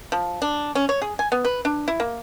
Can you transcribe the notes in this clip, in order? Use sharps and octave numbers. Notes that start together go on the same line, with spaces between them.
F3
D4
C#4
C#5
G#4
G#5
B3
B4
D4
E4
A#3